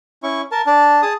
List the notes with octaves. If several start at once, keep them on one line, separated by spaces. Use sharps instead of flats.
C#4 E4 C#6
A#4 A5
D4 A5
G#4 A5 D#6